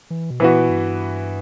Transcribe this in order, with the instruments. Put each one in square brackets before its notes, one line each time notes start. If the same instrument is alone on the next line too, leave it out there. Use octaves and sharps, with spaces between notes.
[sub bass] E3
B2
[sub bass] A#2 [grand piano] E3 B3 F#4
[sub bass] G2